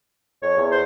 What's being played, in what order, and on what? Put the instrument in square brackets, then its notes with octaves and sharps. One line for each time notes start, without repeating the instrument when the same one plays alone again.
[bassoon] F2 [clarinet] C#5
[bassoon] E2
[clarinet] C5